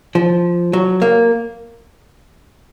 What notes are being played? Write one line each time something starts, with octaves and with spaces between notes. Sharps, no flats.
F3
F#3
A#3